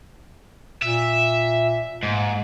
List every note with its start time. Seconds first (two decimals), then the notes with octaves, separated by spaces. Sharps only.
0.82 A#2 E5
2.03 G#2 A#3